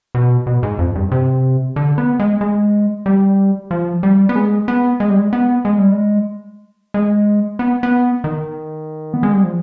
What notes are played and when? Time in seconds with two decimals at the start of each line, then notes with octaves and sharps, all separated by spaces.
0.15 B2
0.47 B2
0.63 G#2
0.79 F2
0.95 G2
1.11 C3
1.76 D3
1.98 B3
2.20 G#3
2.41 G#3
3.06 G3
3.71 F3
4.03 G3
4.29 B3
4.36 G#3
4.68 B3
5.00 G#3
5.10 G3
5.19 G#3
5.33 B3
5.65 G#3
5.78 G3
5.92 G#3
6.94 G#3
7.59 B3
7.83 B3
8.24 D#3
9.14 B3
9.23 G#3
9.33 G3
9.43 F3